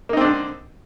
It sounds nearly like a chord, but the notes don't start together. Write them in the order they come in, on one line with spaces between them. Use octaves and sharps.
A#3 D#4 C4 D4 D3